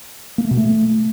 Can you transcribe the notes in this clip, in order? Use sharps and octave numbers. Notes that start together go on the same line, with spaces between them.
A#3
A3
B2
A3